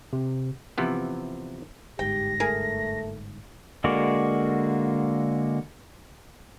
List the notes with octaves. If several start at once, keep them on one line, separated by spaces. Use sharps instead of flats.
C3
C3 E3 F3 B3
G1 G#2 G4 G5 A#6
A3 G#4 A#4
D3 G#3 A#3 F#4 D5